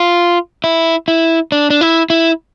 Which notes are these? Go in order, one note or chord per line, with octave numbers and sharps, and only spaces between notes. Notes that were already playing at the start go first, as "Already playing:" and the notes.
Already playing: F4
E4
E4
D4
D4
E4
E4